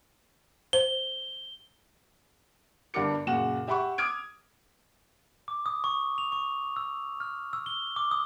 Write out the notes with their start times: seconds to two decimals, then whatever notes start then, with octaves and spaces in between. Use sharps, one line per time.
0.73 C5 G7
2.94 G1 G2 D4 A#4 D6 C#7
3.27 F#2 A#2 C#3 F#4 F#5 E7
3.67 G4 E5 F#5 B5 C#6
3.98 D6 D#6 F6 G#6 D7
5.48 D6
5.66 D#6
5.84 C#6
6.18 F7
6.32 C#6
6.76 E6
7.20 F6
7.53 E6
7.66 G7
7.96 D6
8.11 D#6